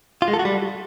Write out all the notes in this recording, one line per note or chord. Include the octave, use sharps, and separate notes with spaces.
F4
G#3
A4
F#4
G3